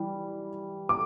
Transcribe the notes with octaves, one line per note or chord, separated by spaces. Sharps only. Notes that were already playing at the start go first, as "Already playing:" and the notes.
Already playing: E3 G3
D6